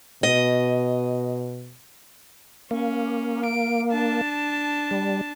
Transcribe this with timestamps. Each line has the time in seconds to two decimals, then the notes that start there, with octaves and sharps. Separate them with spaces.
0.23 B2 D#5
2.71 A#3 C#4
3.45 D7
3.91 D4 A5
4.91 G3